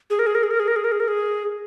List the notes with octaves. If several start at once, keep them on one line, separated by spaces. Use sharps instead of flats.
G#4
A#4
G#4
A#4
G#4
A#4
G#4
A#4
G#4
A#4
G#4
A#4
G#4